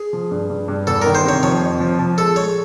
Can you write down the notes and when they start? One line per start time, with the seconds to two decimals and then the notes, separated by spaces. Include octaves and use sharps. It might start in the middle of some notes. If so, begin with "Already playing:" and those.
Already playing: G#4
0.13 F3
0.31 G2
0.50 G2
0.68 G2
0.87 E2 A4
1.02 D#3 A#4
1.15 C5
1.24 C3 C#5
1.43 F3 C#5
1.61 F2
1.80 F3
1.99 F3
2.18 G#3 A4
2.36 G#3 C#5